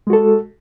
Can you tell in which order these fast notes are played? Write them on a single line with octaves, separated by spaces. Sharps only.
G#3 F#4 A4